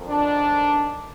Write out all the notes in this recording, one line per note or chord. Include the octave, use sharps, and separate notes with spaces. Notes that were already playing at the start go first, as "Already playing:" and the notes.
Already playing: F2 D#3
D4